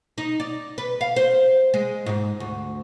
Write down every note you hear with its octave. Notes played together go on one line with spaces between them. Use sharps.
D#4
D5
B4
F5
C5
G#3
G#2
D2